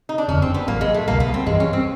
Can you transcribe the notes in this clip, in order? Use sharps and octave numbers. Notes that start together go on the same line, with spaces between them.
D#4
D4
F#1 F2 D3 C#4
C4
B3
A1 A2 F#3 A#3
G#3
A3
C#2 B2 G3 A#3
B3
C4
G2 E3 G3 G#3
C#4
C4